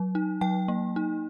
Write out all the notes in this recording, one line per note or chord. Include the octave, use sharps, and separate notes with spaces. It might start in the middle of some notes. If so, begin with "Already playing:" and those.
Already playing: F#3
D#4
F#3 G5
A#3
D#4